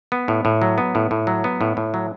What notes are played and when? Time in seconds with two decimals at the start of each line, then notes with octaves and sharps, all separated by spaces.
0.12 B3
0.28 A2
0.45 A2
0.62 F#3
0.78 B3
0.95 A2
1.11 A2
1.27 F#3
1.44 B3
1.61 A2
1.77 A2
1.94 F#3